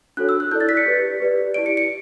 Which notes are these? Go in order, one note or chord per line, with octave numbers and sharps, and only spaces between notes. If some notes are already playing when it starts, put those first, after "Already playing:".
D4 F#4 A4 C#5 F#6
E6
F#6
E4 A4 D5 G6
A6
B6
C#7
G4 B4 D5
G4 B4 D5
E4 G4 D5 D7
C#7
C#7